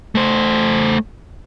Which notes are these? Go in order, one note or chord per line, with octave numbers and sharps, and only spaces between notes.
A3 C5